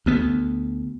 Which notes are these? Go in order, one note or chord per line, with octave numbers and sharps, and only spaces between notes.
D2 B3